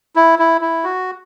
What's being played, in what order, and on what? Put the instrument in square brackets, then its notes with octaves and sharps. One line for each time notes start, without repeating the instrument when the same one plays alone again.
[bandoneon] E4
E4
E4
F#4